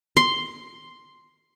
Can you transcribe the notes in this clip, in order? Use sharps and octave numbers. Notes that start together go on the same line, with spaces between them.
C6